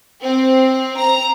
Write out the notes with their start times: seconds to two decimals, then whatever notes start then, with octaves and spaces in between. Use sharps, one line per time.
0.23 C4
0.98 A#5